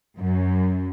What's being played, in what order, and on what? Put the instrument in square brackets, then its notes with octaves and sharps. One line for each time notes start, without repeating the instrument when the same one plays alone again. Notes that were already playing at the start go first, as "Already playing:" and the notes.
[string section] F#2